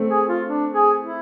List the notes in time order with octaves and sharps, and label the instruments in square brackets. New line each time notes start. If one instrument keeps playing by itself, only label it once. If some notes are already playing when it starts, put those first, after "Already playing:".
Already playing: [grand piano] A3 C4
[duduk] G#4
F4
D4
G#4
E4